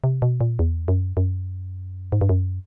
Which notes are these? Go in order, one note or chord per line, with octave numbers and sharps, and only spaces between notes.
C3
B2
A#2
E2
F#2
F#2
G#2
G2
F#2